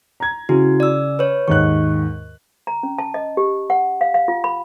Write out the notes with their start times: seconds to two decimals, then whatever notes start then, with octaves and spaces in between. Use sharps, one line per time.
0.20 A#5 G#6
0.49 C#3 E4 F#4
0.80 D5 E6
1.19 B4 C#5
1.48 D#2 G#2 C#6 F#6
2.67 A#5
2.83 C#4
2.98 A5
3.14 D#5
3.37 G4
3.70 F#5
4.01 F5
4.14 F5
4.28 F4
4.44 B5